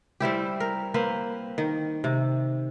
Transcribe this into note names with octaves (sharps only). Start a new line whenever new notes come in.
G3 C4 E4 G4
A#4
A#3 C4 B4
D#3
C3